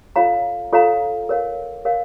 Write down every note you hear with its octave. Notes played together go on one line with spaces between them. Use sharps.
F4 A4 C#5 F5 A#5
F4 A4 C#5 F5 A#5
A#4 C#5 F5
A#4 C#5 F5